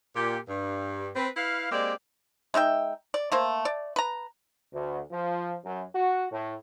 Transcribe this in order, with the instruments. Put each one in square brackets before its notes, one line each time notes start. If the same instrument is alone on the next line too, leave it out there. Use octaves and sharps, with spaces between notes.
[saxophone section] A#2 G4
G2
C4 B4
E4 B4 F5
G#3 A#3 C4 G4 D5
[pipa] G#3 D#4 E5 G5
D5
A3 A#3 C5
D5
B4 A#5
[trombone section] D2
F3
F#2
F#4
A2